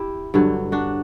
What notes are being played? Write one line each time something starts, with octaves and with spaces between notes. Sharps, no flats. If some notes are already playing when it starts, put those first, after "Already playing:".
Already playing: E4 G4
G2 D3 F#3
D4 F#4